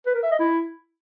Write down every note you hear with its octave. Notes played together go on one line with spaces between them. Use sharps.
B4
A#4
E5
D#5
E4